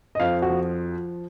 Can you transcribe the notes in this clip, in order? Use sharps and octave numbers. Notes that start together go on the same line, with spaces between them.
D#5
F2 F5
F#4
F3